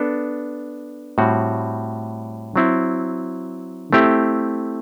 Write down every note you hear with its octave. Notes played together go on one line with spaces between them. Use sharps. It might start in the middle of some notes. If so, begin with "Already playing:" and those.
Already playing: B3 D4 A4
A2 G3 C4 F#4
F#3 C4 E4
A3 C4 E4 G4